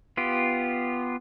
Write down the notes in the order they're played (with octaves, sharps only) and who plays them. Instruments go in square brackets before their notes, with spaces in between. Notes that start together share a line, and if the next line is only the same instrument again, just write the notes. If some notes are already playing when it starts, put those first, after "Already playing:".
[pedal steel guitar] B3 F4 G4